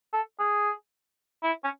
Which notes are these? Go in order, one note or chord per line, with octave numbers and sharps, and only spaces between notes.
A4
G#4
E4
C#4